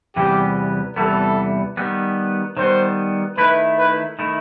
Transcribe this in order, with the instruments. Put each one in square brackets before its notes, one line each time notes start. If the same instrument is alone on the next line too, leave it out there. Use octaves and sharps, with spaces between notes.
[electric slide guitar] E2 C3 E3 G3 B3 [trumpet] G4
[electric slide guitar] E2 C3 E3 G3 B3 [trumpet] A4
[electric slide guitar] D#3 G3 B3
[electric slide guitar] D#3 G3 B3 [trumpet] C5
[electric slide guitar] D#3 A3 E4 [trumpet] B4
[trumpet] B4
[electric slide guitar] D#3 A3 E4